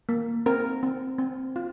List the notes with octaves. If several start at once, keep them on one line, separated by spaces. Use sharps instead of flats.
A#3
C4 A#4
C4
C4
F4